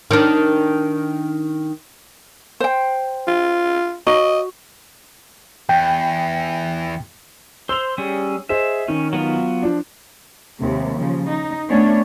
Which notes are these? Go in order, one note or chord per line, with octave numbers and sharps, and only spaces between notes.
D#3 D4
C5 G5
F4
F#4 D#5
E2 G5
C5 C6 E6 F7
G3 C#4 G#4
G#4 C5 D#5 E5
D#3 C#4
F#3 B3 F4
F3 D4
D#2 C3 G#3
C#3 F3
D#4
A3 B3 C#4 D4 C#5